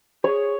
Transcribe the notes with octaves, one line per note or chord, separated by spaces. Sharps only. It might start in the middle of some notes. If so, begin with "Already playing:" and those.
G#4 C#5